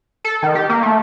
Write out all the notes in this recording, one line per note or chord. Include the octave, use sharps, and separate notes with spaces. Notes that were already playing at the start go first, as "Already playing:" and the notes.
A4
D#3
G4
A#3
A3